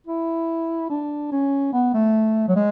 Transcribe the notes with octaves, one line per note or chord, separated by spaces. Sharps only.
E4
D4
C#4
B3
A3
F#3
G#3